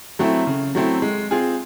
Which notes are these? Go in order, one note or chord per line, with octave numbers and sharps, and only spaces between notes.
F#3 A3 C4 E4
C#3
F#3 A3 C4 E4
G#3
C4 F4 G#4